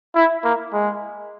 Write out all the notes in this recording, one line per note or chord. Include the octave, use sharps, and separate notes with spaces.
E4
A#3
G#3